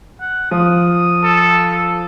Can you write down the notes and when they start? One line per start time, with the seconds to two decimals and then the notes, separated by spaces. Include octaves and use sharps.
0.21 F#5
0.51 F3 D#6
1.24 A4